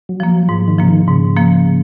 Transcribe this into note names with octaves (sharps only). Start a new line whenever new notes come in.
F#3
F3 A#3
F#3
G#2 F3
D#3
C#3 F3 A#3
D#3
G#2 C#3
F3 A#3